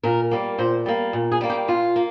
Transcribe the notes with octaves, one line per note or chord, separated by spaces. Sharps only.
A#2 A#4
G3 A#3
A#2 C5
G3 A#3
A#2
G#4
G3 A#3
G4
A#2 F4
A#3